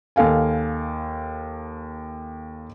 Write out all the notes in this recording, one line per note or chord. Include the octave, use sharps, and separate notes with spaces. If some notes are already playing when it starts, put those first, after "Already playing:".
D#2 A4 F5 G#5